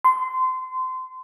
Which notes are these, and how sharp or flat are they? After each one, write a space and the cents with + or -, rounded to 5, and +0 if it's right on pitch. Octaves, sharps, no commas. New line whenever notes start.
C6 -25